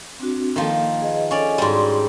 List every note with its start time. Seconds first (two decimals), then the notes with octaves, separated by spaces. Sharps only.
0.20 C4 D4 F#4
0.56 D#3 F3 A#3
1.02 G#4 B4 D#5
1.31 C#4 G#4 A4 D5 D#5
1.58 G#2 G3 F#4 D5 C6